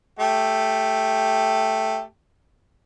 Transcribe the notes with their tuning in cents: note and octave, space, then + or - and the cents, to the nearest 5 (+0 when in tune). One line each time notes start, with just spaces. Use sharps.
A3 +0 G4 +0